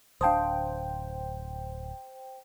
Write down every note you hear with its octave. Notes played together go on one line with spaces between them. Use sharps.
D1 D4 C5 F5 G5 A5 D#6